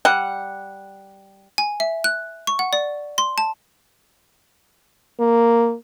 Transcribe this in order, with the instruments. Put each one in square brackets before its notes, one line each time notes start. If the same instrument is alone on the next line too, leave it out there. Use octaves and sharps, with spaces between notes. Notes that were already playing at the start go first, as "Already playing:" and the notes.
[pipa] G3 F#5
[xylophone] G#5
E5
F#6
C#6
F#5
D5
C6
A5
[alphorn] A#3